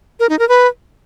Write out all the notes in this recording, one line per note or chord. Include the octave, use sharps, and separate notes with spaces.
A#4
D#4
A#4
B4